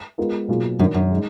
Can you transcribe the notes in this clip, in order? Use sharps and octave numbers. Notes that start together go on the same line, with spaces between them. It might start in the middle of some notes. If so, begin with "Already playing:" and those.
G#3 B3 F4 A#4
B2 F#3 A#3 F4 G#4
F#2 D#3 F#3 D4 F#4 A#4
F#2
G#3 D#4